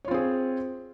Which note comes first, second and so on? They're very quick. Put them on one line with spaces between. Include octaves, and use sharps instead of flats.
C#5 F4 C4 G#4